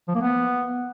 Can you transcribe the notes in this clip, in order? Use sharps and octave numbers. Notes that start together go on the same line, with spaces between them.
F3
A#3
B3